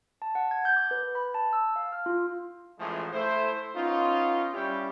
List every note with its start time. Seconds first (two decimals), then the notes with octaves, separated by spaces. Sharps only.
0.22 A5
0.35 F#5
0.51 G#6
0.65 G6
0.76 D6
0.91 B4
1.15 B5
1.34 A5
1.53 E6
1.76 F5
1.92 F6
2.06 F4
2.79 A1 E3 F3 G#3 A3 G#4
3.13 A3 E4 C5
3.76 B3 C#4 D#4 F4
4.54 G3 C#4 E4 G4